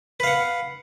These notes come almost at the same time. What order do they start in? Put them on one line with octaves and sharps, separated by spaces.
B4 F5 F#5